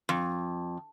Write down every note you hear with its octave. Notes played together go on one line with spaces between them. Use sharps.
F2